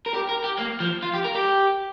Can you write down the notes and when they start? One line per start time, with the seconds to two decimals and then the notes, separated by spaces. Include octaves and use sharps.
0.06 A#4
0.14 G4
0.29 A#4
0.44 G4
0.59 A#3
0.80 F3
1.03 F4
1.14 G4
1.25 A#4
1.36 G4